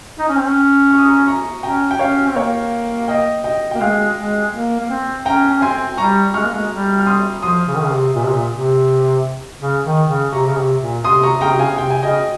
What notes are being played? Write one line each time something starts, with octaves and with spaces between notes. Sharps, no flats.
D#4
C#4
C4
C#4
C#6
D#6
A#5 C#6
A#5 C#6
C#4 G5 A#5
G5
C#4 C#5 F5
C4
A#3 C#5 F5
D#5 G5
D#5 G5
A#3 G5
G#3 F5 G#5
G#3
A#3
A#3
C4
C#4 G5 A#5
C#4
C4 G#5 C6
G3 A#5 C#6
G#3 C#6 F6
A#3
G#3
G3
F6
C6 D#6
F3 C6 D#6
C#3
D#3
C#3
C3
A#2
C3
A#2
C3
C#3
D#3
C#3
C3 A#5 C#6
C#3
C3
A#2
C3 C6 D#6
A#5 C#6
C#3 G5 A#5
C3
C#3 F5 G#5
C3 G5
G#5
C#3 D#5 G5